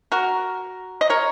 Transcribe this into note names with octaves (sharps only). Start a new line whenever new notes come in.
F#4 A#4
D#5
A#4 C#5